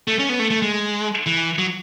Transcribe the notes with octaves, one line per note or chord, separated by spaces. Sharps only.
A3
C#4
B3
A3
A3
G#3
E3
F#3